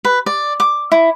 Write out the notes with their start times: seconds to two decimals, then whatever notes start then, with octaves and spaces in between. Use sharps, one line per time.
0.05 B4
0.26 D5
0.60 D6
0.92 E4